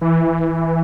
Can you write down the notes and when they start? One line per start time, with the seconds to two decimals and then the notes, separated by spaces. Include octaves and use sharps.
0.01 E3